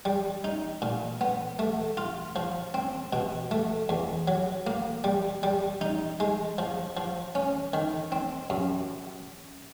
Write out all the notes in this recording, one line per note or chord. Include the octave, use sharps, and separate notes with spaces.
G3
D#4
A#2
B3
A3
F4
F3
C4
B2
A3
E2
F#3
A#3
G3
G3
D#4
G#3
F3
F3
C#4
D#3
C4
F#2